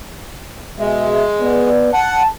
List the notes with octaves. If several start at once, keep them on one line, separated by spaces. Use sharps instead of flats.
B2 G#3 G#4 E5
B3 D5
F#5 A5